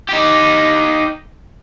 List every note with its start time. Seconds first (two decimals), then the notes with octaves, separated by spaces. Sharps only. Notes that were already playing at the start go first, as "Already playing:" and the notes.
0.09 D#4 G4